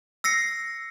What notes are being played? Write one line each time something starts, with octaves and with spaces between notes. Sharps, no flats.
E6 A#6 C7 C#7